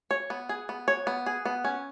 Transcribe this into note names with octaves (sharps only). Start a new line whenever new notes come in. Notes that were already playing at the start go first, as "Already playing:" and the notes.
C#5
B3
G#4
B3
C#5
B3
G#4
B3
C#4